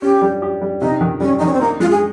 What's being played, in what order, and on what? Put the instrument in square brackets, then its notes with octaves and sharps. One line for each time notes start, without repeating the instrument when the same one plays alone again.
[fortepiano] C#4 [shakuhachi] G4
[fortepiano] G3
G4
G3
[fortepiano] C3 [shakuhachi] D#4
[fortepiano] D#3
[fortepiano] G3 [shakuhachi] C#4
[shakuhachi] D#4
[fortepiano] D#3 [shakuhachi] C#4
[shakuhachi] C4
[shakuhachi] A#3 [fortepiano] D#4
[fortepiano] G#3 [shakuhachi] F4
[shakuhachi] G#4